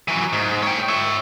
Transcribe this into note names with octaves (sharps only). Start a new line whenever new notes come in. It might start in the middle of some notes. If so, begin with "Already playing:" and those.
E3 F#3
G#2
C#5 G5
C#5 E5